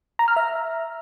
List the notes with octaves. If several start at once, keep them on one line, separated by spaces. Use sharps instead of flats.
A#5
F6
E5